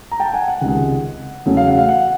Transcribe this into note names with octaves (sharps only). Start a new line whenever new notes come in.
A#5
G5 A5
F#5 G#5
F#5
C#2 C3 D#3 G#3
E2 C#3 F#3 A3 C#4
F5
F#5
F5
F#5